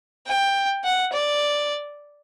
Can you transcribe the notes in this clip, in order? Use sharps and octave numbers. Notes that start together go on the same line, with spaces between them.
G5
F#5
D5